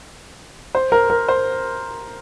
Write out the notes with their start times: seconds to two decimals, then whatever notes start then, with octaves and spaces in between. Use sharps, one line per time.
0.75 C5
0.92 A#4
1.10 A#4
1.28 C5